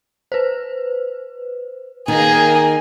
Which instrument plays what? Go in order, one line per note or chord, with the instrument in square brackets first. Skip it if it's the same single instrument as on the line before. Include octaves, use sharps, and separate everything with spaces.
[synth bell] B4 C5
[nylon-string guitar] D#3 [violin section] A#3 D#5 G#5 [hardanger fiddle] G#4